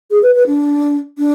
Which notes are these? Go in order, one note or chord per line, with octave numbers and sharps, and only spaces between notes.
G#4
B4
B4
D4
D4